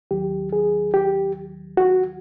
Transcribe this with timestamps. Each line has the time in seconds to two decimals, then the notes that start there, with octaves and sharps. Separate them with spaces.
0.11 D#2 D#3 F#3 G4
0.53 G#4
0.94 G4
1.77 F#4